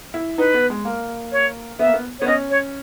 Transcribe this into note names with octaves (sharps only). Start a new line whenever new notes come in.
E4
D#4 B4
B3
G#3
A#3
C#5
B3 E5
A#3
B3
B3 C#5
C#4 D#5
C#5